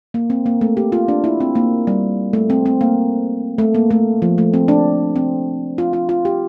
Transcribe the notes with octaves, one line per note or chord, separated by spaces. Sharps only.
A#3
C4
A#3
A3
G4
F4
D4
E4
C4
A#3
G3
A3
C4
C4
A#3
A3
A#3
A3
F3
A3
C4
D4
C4
F4
F4
F4
G4